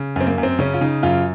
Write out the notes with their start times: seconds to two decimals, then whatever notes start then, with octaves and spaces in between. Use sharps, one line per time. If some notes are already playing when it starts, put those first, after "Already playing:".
Already playing: C#3
0.16 F#2 C4
0.27 A#3
0.38 F#2
0.43 C4
0.59 C#3 C#4
0.74 F4
0.81 C#3 D#4
1.03 F#2 F4